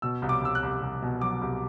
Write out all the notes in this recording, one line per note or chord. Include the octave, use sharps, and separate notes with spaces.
B2 E6
C2
D6
C2 E6
F#6
C2
C2
B2
F#3 D6
C2